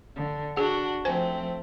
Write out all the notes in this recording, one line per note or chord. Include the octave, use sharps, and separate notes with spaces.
D3
D4 F#4 G#4 F#5
F3 A3 C4 C5 G#5